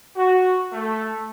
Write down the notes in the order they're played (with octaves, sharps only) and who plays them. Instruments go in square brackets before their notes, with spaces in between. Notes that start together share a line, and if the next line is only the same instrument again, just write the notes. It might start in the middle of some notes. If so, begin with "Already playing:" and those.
[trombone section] F#4
A3